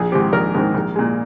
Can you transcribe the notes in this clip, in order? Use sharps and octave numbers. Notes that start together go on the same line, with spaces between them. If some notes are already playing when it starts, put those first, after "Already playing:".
Already playing: A#1 G#4
G#2 D#3 G#3 C4 G4
A#1 A#4
G#2 D#3 G#3 C4
A#1
A#2 G#3